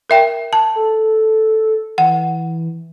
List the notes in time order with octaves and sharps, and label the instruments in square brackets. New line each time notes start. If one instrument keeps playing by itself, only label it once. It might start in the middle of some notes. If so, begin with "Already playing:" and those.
[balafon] A#4 E5 G5
A5
[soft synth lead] A4
[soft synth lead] E3 [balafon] F#5